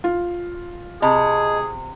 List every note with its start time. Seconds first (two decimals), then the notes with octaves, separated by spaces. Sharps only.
0.04 F4
1.02 C3 G#4 D#5 A5 B5